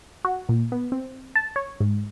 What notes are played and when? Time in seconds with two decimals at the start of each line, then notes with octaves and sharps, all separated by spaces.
0.25 F#4
0.49 A#2
0.72 B3
0.92 C4
1.36 A5
1.56 C#5
1.80 G#2